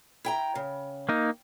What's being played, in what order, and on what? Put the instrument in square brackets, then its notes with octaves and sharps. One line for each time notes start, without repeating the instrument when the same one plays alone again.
[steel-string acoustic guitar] E4 G5 A#5
C#3
[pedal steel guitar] A#3 D#4